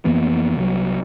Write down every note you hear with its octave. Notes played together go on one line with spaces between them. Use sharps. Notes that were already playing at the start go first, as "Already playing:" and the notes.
F2 E3 A#3 B3
C2 F#3